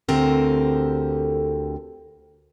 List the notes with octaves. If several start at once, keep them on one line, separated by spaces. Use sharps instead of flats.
D2 D3 C4 G4 A4 A#4